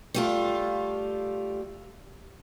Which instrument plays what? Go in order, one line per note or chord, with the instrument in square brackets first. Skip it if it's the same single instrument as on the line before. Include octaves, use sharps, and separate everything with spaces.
[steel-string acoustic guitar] G3 A3 F4